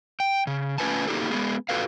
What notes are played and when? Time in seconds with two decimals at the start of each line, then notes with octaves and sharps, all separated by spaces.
0.20 G5
0.47 C#3
0.78 A3 C#4 F4 B4 G#5 A5
1.07 A#3 D#4 F#4 G4 A4
1.31 G#3 B3 G#4
1.69 F4 F#4 A4 B4 F5